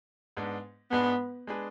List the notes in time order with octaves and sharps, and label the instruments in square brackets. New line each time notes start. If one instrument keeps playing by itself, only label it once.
[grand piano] G#2 G#3 B3 D4
[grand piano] G#2 G#3 D4 G#4 B4 [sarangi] B3
[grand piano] G#3 D4 G#4 B4